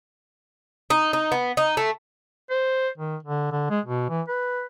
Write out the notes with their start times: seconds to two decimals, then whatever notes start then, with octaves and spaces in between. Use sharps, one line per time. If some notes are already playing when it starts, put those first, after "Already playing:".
0.90 D#4
1.13 D#4
1.32 B3
1.57 D#4
1.77 A3
2.50 C5
2.98 D#3
3.23 D3
3.52 D3
3.70 G#3
3.86 B2
4.09 E3
4.28 B4